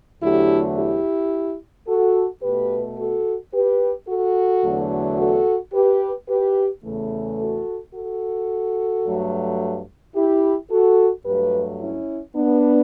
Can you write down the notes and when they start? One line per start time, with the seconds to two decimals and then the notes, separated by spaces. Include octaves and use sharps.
0.21 E2 D3 F#3 A3 E4 G4
0.77 E4 G4
1.87 F#4 A4
2.42 B2 A3 G4 B4
2.98 F#4 A4
3.53 G4 B4
4.08 F#4 A4
4.63 E2 D3 F#3 A3
5.18 F#4 A4
5.73 G4 B4
6.29 G4 B4
6.84 E2 C#3 E3 A3
7.40 F#4 A4
7.94 F#4 A4
9.04 G2 F#3 A3
10.15 E4 G4
10.71 F#4 A4
11.25 G2 F#3 A3 G4 B4
11.80 C#4 E4
12.36 B3 D4